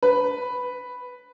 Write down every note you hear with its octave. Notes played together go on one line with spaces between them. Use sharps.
B4